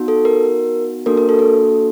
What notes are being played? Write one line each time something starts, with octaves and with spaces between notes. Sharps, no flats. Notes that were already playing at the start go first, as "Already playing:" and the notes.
Already playing: B3 D#4 F#4
A4
A#4
A#3 D4 F#4 A4 A#4
A#4
A4
A4